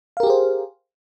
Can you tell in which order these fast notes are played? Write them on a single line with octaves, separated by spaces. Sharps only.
F5 A#4 G4 G#4 C5